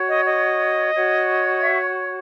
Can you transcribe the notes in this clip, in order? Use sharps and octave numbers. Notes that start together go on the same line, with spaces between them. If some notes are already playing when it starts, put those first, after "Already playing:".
Already playing: F#4 C#5
D#5
D#5
F#4 C#5
E5